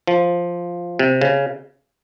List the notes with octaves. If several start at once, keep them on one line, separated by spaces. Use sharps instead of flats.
F3
C3
C#3